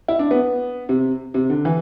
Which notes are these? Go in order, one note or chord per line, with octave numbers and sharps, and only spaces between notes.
E4
D4
B3
C3
C3
D3
E3